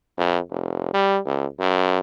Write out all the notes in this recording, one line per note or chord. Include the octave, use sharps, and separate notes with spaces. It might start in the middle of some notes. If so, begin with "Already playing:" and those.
F2
F1
G3
C#2
F#2